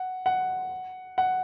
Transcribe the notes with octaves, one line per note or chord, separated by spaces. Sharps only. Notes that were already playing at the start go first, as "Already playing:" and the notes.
Already playing: F#5
F#5
F#5